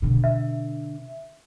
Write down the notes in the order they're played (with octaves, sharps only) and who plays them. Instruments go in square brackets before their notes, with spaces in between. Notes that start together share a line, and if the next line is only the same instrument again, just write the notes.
[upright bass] B2 D3
[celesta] E5